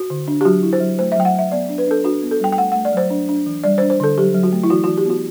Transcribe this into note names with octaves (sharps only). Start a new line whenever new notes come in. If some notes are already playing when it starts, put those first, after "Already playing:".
Already playing: F#4
D3
D4
G4
F#3 F#4
E4
C5
F#3
A3 C5
E5
F#3 G5
F#5
F#3 E5
B3 D5
D4
B4
D4 A4
D4 F#4
B3
A4
G3 G5
G5
A3 F#5
A3 F#5
D5
F#3 C5
D4
D4
E3
G3 D5
C5
D4
C5
D3 A4
F#3 G4
F#3
F#4
A3
E4
E3 F#4
E3 F#4
G4
B3 F#4